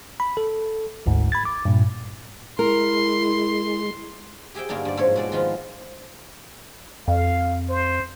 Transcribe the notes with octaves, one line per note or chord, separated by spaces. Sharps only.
B5
A4
G1 D2 G#2
B5 G#6 A6
D6
G2 A#2
G#3 E4 A#4 C6
G4 G#4 E5 G5
G2 D3 A#3 D4 D#4
G2 D5
G#2 F3 C#5
B2 G#3 D5
D#3 F3 B3 F4
F2 F5
C5